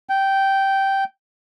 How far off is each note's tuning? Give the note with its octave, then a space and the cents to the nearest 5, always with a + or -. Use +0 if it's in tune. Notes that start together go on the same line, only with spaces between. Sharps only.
G5 -10